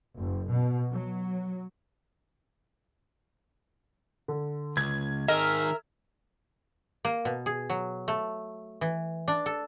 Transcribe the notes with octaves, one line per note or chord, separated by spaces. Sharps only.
F#1
B2
F#3
D3
C#2 G#6
D#3 G#4 A#4 D#5 E5
A#3
B2
G#4
F#3
A3
E3
D4
A4